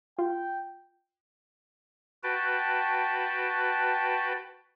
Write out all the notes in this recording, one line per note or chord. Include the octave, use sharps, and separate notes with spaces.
F4 G5
F#4 B4 G5 A5